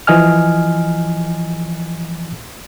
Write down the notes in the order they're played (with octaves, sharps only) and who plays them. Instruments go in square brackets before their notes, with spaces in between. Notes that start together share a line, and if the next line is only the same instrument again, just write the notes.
[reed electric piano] E3 F3 D#5 G#5 F6